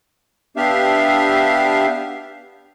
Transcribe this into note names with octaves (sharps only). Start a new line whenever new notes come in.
B3 D4 G4 E5 F5